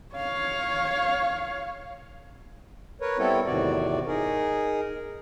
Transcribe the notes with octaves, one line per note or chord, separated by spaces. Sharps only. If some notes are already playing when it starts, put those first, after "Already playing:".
C#5 F5
A#4 B4 C#5
G3 B3 C4 E4 A4 C#5
E2 A2 C3 D#3 F#4 D5
D#4 G#4 A#4